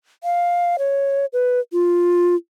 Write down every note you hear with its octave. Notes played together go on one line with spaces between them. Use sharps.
F5
C#5
B4
F4